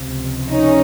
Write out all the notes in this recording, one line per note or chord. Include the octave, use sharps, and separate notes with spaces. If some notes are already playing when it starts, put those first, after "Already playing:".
Already playing: C#2 C3 F3
C#4 D#4